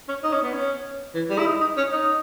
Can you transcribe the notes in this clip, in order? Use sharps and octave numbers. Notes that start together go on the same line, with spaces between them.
C#4
D#4
C#4
B3
C#4
E3
G3
E4
D#4
D#4
C#4
D#4